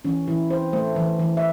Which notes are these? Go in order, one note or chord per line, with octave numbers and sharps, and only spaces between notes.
E3 C#4
E3 E4
C4 C5
A3 C5
E3
E3
E5